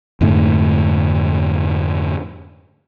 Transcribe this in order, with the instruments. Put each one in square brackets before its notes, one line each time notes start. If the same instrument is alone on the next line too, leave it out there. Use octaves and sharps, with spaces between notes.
[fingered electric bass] F2 G#2 D3 A3